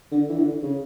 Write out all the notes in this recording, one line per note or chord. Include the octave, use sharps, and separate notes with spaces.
D3
E3
D3
C#3